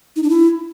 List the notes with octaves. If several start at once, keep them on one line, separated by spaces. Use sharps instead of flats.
D#4
D4
E4